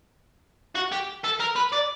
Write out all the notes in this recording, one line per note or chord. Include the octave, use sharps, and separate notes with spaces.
F#4
G4
A4
A#4
B4
D5